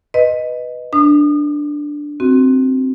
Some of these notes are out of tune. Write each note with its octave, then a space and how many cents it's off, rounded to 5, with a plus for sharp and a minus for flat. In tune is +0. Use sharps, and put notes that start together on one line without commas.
B4 +0 D#5 +0
D4 +0 D#6 -35
C4 +0 F#4 +5